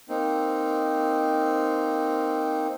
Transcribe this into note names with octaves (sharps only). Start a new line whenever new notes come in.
A#3 C4 D#4